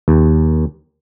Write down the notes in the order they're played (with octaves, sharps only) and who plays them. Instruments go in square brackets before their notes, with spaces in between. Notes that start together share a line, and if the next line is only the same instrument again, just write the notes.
[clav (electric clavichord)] D#2